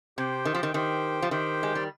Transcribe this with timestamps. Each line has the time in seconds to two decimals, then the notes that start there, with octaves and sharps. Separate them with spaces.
0.18 C3 G4 C5 G5
0.45 D#3
0.55 F3
0.63 D#3
0.74 D#3 G4 C5 G5
1.22 F3
1.31 D#3 G4 C5 G5
1.63 G#3
1.75 G3